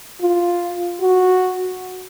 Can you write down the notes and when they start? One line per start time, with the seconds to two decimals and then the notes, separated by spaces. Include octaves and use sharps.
0.22 F4
1.01 F#4